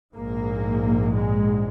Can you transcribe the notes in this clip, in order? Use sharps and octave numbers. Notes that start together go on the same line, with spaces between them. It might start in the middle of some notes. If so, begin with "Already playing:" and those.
A#1 G#2 A#3
G#3